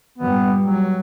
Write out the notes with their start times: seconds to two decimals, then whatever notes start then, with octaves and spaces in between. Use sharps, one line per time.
0.18 G2 A#2 G3 B3
0.61 F#3